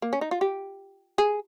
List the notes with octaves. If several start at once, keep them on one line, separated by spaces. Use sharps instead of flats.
A#3
C#4
D#4
F4
G4
G#4